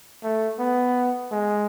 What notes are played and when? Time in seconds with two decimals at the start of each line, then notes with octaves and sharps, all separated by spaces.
0.23 A3
0.59 B3
1.32 G#3